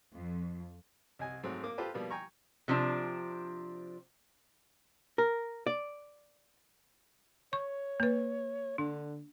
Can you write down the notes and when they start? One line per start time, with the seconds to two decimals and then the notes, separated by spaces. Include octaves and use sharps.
0.13 F2
1.19 C2 D#5 G#5
1.43 G#2 F#3 A3 C4
1.64 A#3 D6
1.78 F4 G4 A4 B4 C5
1.94 B2 F3 G3 A#3 B3
2.11 G5 G#5 A#5 C#6
2.68 C3 F3 C4 D4
5.18 A#4
5.67 D5
7.53 C#5 C#6
8.00 A#3 B4
8.78 D3 D4